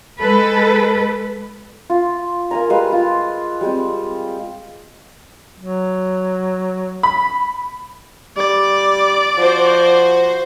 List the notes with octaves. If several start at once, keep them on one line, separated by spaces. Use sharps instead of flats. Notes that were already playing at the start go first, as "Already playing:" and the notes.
G#3 A4 B4
F4
A#3 G#5 A#5
G3 G#3 B4 F5
F4
G3 G#3 C4
F#3
B5
G3 D5
F3 F#4 C5